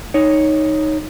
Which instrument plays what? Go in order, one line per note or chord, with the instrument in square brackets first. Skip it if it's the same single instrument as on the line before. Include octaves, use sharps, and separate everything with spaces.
[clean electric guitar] D#4 C#5